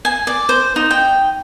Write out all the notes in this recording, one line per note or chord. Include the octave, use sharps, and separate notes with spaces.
G#5
D5
C5
D#4
G5